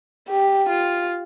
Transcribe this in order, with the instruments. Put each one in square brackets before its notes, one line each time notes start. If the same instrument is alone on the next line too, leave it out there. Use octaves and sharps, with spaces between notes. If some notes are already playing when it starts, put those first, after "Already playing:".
[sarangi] G4
F4